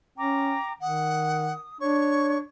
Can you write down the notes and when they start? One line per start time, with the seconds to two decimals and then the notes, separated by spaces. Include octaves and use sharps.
0.18 C#4 G5 A#5 D6
0.81 D#3 F#5 D#6
1.81 D4 C#5 C#6